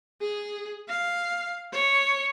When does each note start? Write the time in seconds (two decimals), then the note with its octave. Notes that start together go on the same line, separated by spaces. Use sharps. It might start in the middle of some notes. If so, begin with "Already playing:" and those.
0.21 G#4
0.89 F5
1.73 C#5